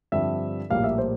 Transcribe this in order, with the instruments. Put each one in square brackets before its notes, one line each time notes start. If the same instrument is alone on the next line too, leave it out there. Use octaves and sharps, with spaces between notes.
[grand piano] G2 D3 F3 C4 E5
A#1 A2 G3 A#3 F5
E5
C5